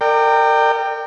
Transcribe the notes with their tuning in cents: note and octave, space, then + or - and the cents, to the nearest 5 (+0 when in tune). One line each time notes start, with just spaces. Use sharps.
A#4 -30 D5 +30 G5 +0